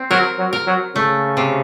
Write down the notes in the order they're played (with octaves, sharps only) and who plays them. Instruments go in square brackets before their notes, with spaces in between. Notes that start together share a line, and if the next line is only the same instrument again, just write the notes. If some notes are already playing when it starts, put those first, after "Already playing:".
Already playing: [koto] C4
[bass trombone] F#3 [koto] A#4
[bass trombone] F#3
[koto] A#4
[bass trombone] F#3
[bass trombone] C#3 [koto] A3
[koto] C3